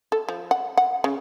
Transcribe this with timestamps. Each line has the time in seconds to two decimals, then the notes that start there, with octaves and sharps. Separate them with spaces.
0.12 A4
0.29 F3
0.51 F#5
0.77 F#5
1.04 C#3